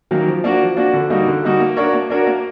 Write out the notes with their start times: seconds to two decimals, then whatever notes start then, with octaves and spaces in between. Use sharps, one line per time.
0.11 D#3 F#3 A#3 C#4
0.27 F3
0.44 A#3 D4 F#4
0.61 F3
0.77 A#3 D4 F#4
0.93 D3
1.10 G3 A#3 D#4 F#4
1.27 D3
1.43 G3 A#3 D#4 F#4
1.60 A#3
1.77 D4 F#4 A#4 C#5
1.93 A#3
2.10 D4 F#4 A#4 C#5
2.27 A#3